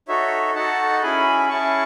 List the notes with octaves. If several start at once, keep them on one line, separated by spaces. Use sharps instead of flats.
D#4 F#4 A4 C#5 E5
D#4 F#4 A4 F#5 A5
C#4 E4 G#4 G#5 B5
B5
C#4 E4 G#4 A5 C#6